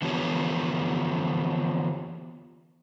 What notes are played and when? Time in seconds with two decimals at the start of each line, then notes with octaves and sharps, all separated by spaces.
0.02 D3 E3 F3 B3 G4 C#5